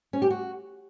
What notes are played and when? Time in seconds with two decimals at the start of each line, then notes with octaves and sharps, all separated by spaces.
0.13 C#4
0.22 G4
0.30 F#4